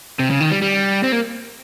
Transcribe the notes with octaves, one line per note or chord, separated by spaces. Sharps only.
C3
C#3
D#3
G3
G3
C4
A#3